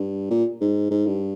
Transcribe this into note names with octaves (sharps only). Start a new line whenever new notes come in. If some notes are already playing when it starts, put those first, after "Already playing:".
Already playing: G2
A#2
G#2
G#2
G2